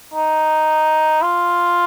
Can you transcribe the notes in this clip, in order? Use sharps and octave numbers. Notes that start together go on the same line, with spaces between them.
D#4
F4